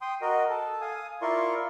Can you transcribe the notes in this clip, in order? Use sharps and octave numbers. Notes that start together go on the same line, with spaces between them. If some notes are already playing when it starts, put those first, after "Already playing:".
G5 C6 D#6
F#4 A#4 D#5
A4
F5 G#5 D#6
E4 F4 A#4 D5 C6 C#6